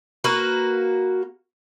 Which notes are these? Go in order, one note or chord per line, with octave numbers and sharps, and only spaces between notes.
A#3 F#4 B4